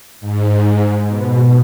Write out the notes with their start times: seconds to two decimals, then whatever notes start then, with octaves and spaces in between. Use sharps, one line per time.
0.21 G#2
1.08 B2